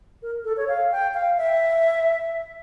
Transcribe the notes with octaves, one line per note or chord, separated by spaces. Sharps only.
A#4
A4
C#5
F5
G5
F5
E5